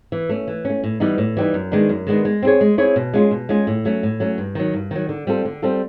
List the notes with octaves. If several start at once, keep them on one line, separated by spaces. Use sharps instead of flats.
E3
A3 C#4
E3
A3 C#4
A2
E3 G3 B3 D#4
A2
E3 G3 B3 D#4
F#2
D#3 G#3 B3 D4
F#2
D#3 G#3 B3 D4
G#3
C4 E4 G#4 C#5
G#3
C4 E4 G#4 C#5
B2
G#3 C#4 F4 G#4
B2
G#3 C#4 F4 G#4
A2
F#3 A3 C#4
A2
F#3 A3 C#4
G2
D#3 F#3
G2
D#3 F#3
D3
G3 C4 F4 A4
D3
G3 C4 F4 A4